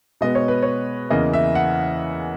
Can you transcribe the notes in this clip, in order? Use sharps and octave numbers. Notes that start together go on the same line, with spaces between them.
B2 G#3 B3 D#5
C#5
B4
C#5
E2 C#3 E3 A#3 D#5
E5
F#5